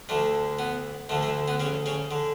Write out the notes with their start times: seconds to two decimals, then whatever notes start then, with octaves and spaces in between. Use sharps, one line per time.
0.09 D2 D3 A3
0.59 B3
1.09 D2 D3 A3
1.23 A3
1.48 B3
1.60 C#3 C#4
1.86 C#3 C#4
2.11 D3